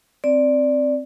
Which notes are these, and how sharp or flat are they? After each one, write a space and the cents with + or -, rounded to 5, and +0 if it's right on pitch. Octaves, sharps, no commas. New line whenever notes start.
C4 +0 D5 +0